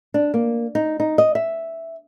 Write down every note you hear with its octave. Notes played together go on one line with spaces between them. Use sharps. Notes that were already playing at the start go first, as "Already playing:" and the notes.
D4
A#3
D#4
D#4
D#5
E5